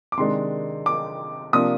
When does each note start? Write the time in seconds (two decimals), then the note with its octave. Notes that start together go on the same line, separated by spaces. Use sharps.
0.12 D6
0.17 C3 D#3 G#3 D4 C6
0.86 D6
1.53 C3 F3 A#3 D4 D#6